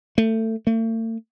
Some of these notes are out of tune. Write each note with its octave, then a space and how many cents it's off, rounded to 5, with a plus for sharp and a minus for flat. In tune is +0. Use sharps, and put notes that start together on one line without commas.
A3 +25
A3 +45